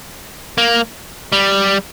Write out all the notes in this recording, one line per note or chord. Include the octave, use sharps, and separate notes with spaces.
A#3
G3